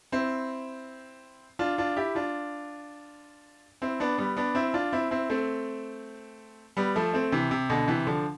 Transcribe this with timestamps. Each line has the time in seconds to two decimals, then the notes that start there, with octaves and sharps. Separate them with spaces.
0.12 C4 E4
1.59 D4 F4
1.78 D4 F4
1.97 E4 G4
2.15 D4 F4
3.82 C4 E4
4.00 B3 D4
4.18 G3 B3
4.37 B3 D4
4.55 C4 E4
4.74 D4 F4
4.93 C4 E4
5.11 C4 E4
5.30 A3 C4
6.77 G3 B3
6.96 F3 A3
7.13 A3 C4
7.32 C3 E3
7.51 C3
7.69 B2 D3
7.88 C3 E3
8.07 D3 F3